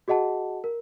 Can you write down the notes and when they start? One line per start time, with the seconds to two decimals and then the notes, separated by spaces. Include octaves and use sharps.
0.08 F#4 G#4 D#5 F#5 A5
0.64 A#4